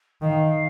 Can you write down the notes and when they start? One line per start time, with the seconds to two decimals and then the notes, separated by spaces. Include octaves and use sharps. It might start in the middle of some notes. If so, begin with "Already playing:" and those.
0.22 D#3 F5